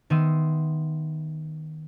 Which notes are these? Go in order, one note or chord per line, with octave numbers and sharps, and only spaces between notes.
D#3 B3 E5 C6 D#6